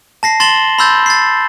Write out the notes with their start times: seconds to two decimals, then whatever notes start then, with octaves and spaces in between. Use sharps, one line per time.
0.23 A5 A#6 C7
0.40 C6 A6 E7 F#7 G7
0.78 B5 C6 E6 G6 A6
1.06 A6 C7